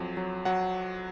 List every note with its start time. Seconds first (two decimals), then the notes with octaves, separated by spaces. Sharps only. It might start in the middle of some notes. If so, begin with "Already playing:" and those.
Already playing: F2 F#3
0.17 F#3
0.45 F#3 F#5